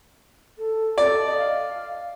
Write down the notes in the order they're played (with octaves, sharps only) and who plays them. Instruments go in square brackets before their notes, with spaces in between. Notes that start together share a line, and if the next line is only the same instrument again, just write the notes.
[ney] A4
[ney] A4 [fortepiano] D5
[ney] D#5
F5